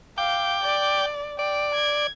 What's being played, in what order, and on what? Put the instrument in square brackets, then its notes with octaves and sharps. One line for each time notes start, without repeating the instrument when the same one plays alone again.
[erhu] F5 [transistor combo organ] G5 D6
[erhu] D5
[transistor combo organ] D5 [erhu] G5
[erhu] G#6